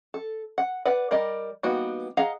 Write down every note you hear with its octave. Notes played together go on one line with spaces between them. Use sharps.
A4
F#5
B4 D5 F#5
G3 A#4 D5 D#5
G3 A#3 B3 D#4 F#4
G#4 D#5 F5 F#5 A#5